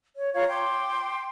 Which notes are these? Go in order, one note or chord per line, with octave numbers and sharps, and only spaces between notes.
C#5
F4 C#5 F5 A#5
G5 C6 D6